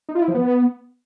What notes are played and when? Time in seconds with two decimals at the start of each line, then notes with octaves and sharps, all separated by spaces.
0.09 D#4
0.15 F4
0.22 E4
0.28 F3
0.35 B3